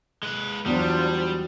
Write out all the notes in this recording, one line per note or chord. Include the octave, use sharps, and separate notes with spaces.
G#3 B4
E2 F#3 G3 D4 F4 F#4 C5 D#6